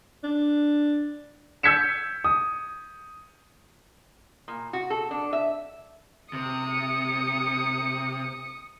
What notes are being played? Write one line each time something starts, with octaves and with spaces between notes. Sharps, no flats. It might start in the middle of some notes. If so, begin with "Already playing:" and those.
D4
E6 G6 G#6 B6 C#7 E7
D#6
A#2
F#4
A4
D4
E5
C3 D#6 C#7